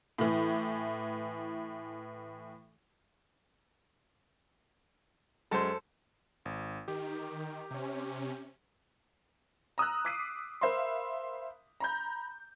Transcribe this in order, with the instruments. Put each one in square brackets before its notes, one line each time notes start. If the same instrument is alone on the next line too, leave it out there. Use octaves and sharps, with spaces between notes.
[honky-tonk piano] A2 E3
[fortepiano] F#2 G#3 [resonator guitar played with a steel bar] A4 C5
[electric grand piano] G#1
[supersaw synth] D#3 [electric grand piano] G4
[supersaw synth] C3 C#4
[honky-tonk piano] A#5 D#6 E6 F#6
D6 E6 B6 C7 D#7
A#4 C5 E5 F5 B5 C6
A#5 B5 G6